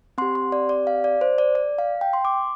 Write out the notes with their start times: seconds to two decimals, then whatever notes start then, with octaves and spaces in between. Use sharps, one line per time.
0.18 C4 G4 C6
0.35 C6
0.52 D5
0.69 D5
0.87 F5
1.04 D5
1.21 C5
1.38 D5
1.55 D5
1.79 F5
2.01 G5
2.13 C6
2.25 D6